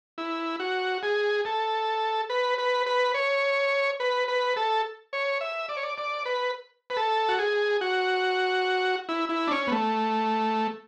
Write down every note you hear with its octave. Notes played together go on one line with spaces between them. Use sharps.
E4
F#4
G#4
A4
B4
B4
B4
C#5
B4
B4
A4
C#5
E5
D5
C#5
D5
D5
B4
B4
A4
F#4
G#4
F#4
E4
E4
D4
C#4
B3
A3